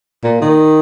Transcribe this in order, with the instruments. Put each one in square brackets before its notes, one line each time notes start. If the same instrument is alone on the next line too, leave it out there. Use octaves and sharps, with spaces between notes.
[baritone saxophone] A#2
D#3